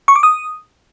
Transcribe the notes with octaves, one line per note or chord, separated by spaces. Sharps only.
C#6
D6
D#6